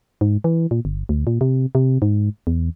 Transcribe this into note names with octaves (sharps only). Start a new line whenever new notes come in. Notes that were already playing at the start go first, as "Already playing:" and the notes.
G#2
E3
A#2
G1
D2
A#2
C3
C3
G#2
E2